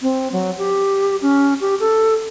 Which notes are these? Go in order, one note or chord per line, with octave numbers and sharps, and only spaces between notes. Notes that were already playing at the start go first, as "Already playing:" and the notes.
C4
F#3
G4
C#4
G4
A4